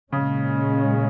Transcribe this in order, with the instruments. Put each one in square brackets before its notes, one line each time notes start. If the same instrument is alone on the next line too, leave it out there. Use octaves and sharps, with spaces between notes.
[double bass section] A#2 G#3 C#4 [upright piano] C#3